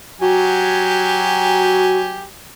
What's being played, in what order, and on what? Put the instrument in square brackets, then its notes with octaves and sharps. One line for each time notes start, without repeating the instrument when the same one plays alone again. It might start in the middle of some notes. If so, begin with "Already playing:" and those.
[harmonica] F#3 G4 G#5 [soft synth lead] F#4